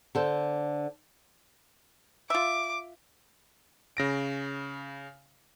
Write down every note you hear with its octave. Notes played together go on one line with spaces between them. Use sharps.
D3 A4 C5
F4 E5 D6
C#3 A#6 D7